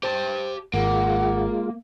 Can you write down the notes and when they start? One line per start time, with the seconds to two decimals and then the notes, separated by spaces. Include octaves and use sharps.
0.03 G4 C5 A5
0.74 G#1 G#3 A#3 F4 F#5